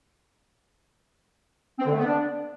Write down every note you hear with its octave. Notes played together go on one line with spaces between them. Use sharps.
C4
D3
A3
B3
D4